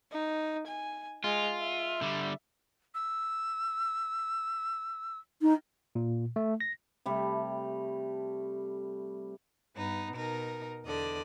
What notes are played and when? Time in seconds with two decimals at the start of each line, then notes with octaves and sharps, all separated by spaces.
0.12 D#4
0.67 G#5
1.24 G#3 F4
1.58 E5
2.02 D3 G3
2.95 E6
5.41 D#4
5.95 A#2
6.36 A3
6.60 A#6
7.06 C3 G3 A3
9.76 G2 B3 D#4
10.14 B2 D#4 A#4
10.85 E2 D3 D5 D#5